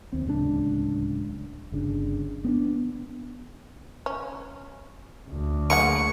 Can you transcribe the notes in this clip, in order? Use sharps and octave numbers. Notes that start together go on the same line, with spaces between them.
D#2 C4
D1 C#2 B2 D4
G1 C#3 D4
B3 C4 D4
C#4
D2
A#3 G#4 F#5 C#6